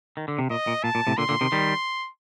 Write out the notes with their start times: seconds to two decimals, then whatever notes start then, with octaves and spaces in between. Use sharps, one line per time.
0.17 D#3
0.28 D3
0.38 C3
0.50 A#2 D#5
0.67 A#2
0.83 A#2 A5
0.95 A#2
1.07 A2 C3
1.18 A#2 D3 C6
1.29 A#2 D3
1.41 C3 D#3
1.52 D#3 G3